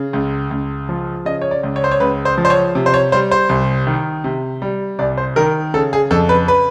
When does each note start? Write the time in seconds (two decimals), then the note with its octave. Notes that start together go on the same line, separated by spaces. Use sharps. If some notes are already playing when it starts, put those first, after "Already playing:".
Already playing: C#3
0.13 C#2
0.51 C#2
0.89 F3
1.25 C#3 D#5
1.42 C#5
1.51 D5
1.63 C#2
1.76 C#5
1.84 C5
1.92 C#5
2.00 C#2 B4
2.25 C5
2.38 F3
2.45 C5
2.50 C#5
2.75 C3
2.86 C5
2.94 C#5
3.12 G3 C5
3.31 C5
3.49 C2
3.87 D#3
4.24 C3
4.62 G3
4.99 C2 D5
5.17 C5
5.36 D#3 A#4
5.74 C#3 A4
5.93 G#4
6.11 F2 A4
6.29 B4
6.48 B4